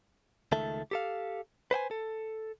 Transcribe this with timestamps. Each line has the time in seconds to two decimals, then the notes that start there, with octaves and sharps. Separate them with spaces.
0.52 C#2 D#3 A3 A4 E5
0.91 G4 A4 F5
1.71 B4 C5 G5 G#5
1.91 A4